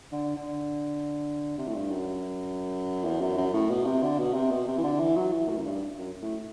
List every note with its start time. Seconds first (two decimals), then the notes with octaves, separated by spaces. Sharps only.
0.12 D3
0.36 D3
1.58 C3
1.68 A2
1.75 G2
1.91 F#2
3.05 E2
3.21 F#2
3.37 F#2
3.53 A2
3.70 B2
3.86 C3
4.02 D3
4.18 B2
4.34 C3
4.51 B2
4.68 C3
4.78 E3
4.84 D3
5.00 E3
5.16 F#3
5.32 E3
5.49 A2
5.57 F#2
5.65 G2
5.98 F#2
6.22 A2